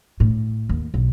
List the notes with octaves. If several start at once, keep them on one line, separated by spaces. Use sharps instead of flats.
A2
D#2
B1